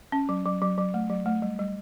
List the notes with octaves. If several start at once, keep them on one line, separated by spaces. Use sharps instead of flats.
C#4
F#3
F#3
F#3
F#3
A3
F#3
A3
G3
G3